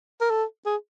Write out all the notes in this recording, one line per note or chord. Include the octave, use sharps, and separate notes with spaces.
A#4
A4
G#4